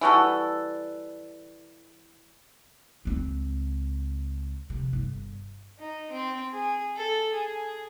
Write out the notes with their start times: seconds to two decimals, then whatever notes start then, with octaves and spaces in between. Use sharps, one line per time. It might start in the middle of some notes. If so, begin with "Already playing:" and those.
0.01 E3 G3 F#4 A4
3.05 C#2 C4
4.70 C3 F3
4.93 G1
5.79 D#4
6.11 C4
6.52 G#4
6.96 A4
7.33 G#4